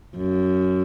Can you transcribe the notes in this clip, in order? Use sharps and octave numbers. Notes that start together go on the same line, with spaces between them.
F#2